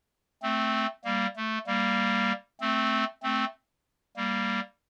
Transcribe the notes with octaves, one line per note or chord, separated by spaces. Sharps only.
A3 C4
G3 A#3
A3
G3 A#3
A3 C4
A3 C4
G3 A#3